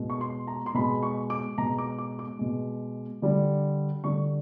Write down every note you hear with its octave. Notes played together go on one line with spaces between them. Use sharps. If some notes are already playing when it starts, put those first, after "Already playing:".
Already playing: B2 G#3
C#6
C6
A#5
C6
B2 G#3 B5
C#6
D6
B2 G#3 A#5
D6
D6
D6
B2 G#3
D3 G3
D3 G3 C#6